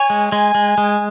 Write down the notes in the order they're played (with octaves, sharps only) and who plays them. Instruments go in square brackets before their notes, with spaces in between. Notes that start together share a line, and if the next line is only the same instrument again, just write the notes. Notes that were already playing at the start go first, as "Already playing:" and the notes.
Already playing: [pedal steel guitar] C#5 [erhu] G#5
[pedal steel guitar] G#3
[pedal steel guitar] G#3 [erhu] G#5
[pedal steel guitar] G#3
G#3